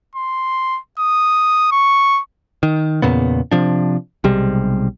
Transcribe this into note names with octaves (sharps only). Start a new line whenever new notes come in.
C6
D#6
C#6
D#3
E2 A#2 C#3 B3
C3 F3 D4
B1 C3 G3 G#3